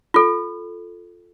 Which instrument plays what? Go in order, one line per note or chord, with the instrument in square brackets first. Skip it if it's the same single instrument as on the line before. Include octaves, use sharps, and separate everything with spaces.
[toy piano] F4 A4